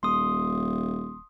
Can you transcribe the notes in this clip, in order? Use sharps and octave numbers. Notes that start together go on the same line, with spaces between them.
D#1 C6 D#6